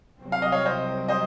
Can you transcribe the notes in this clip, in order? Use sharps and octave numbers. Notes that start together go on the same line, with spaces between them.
C2 C3 F#3 C4
F5
D#5
C#5 F5
C5 D#5
C5 D#5